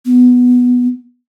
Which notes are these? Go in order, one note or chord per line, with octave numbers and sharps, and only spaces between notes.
B3